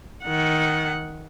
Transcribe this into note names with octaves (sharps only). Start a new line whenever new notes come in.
D#3 F#5